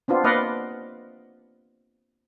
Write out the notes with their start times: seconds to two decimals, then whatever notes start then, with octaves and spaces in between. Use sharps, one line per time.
0.08 B3 C4 D4 F4
0.24 A#3 B4 D5 D#5 F5 F#5